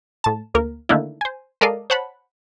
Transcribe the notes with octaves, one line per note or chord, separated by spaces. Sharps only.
A2 A5
D2 A#3 A#4
D3 D#3 A3 A#3 D4 E4
C5 G#5
G#3 A4 A#4 D5 D#5 F5
C5 C#5 F#5 A5 B5